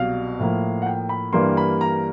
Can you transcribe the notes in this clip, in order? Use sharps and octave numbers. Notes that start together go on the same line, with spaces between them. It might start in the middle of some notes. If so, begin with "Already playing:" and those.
Already playing: C2 B2 F#3 F5
A2 F3 A#3
F#5
G5
B5
G2 E3 G3 A#3 C6
B5
A#5